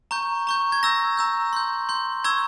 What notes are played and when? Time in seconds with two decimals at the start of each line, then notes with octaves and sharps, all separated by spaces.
0.11 A#5 C#6 G6
0.47 A#5 C#6 G6
0.72 G#6
0.83 A#5 E6 G6 A#6
1.17 A#5 E6 G6
1.53 C6 G6
1.89 C6 G6
2.24 A#5 C#6 E6 G6 G#6